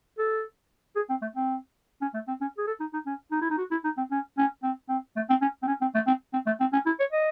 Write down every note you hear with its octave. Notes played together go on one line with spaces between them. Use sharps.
A4
G#4
C4
A3
C4
C#4
A3
C4
C#4
G#4
A4
D#4
D#4
C#4
D#4
E4
D#4
F#4
E4
D#4
C4
C#4
C#4
C4
C4
A3
C4
C#4
C4
C#4
C4
A3
C4
C4
A3
C4
C#4
E4
C#5
D#5